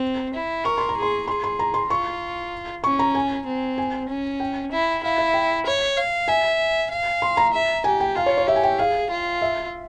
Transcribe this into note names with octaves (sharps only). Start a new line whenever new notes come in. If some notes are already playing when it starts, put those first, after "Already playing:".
Already playing: C4
E4
A#4 C#6
C6
A#5
G#4
C6
G#4 C6
C6
A#5
C6
F4 C#6
C#4 C#6
A#5
G#5
C4
G#5
C#4
G5
E4
E4 F5
E5
G5
C#5
F5
E5 G#5
F5
C6
A#5
E5
G4 G#5
G5
F4 F5
C#5
C#5
G4 E5
G#5
G5
G#4 F5
F4
E5